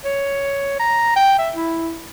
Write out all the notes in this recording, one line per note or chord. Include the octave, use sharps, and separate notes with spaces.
C#5
A#5
G5
E5
E4